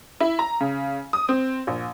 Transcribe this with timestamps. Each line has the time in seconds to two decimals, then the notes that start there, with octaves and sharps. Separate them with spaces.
0.20 E4
0.39 A#5
0.60 C#3
1.13 D#6
1.29 C4
1.67 A#1